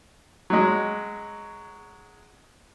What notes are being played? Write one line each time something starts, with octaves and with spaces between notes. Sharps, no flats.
F#3 G#3